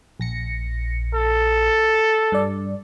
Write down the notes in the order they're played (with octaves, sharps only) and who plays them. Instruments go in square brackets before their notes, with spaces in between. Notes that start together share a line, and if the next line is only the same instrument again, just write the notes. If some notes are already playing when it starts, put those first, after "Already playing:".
[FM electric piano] A#1 A#6 C#7
[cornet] A4
[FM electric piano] G2 D5